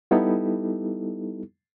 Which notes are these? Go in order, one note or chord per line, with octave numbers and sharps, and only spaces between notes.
G3 B3 D#4 E4 G4 A4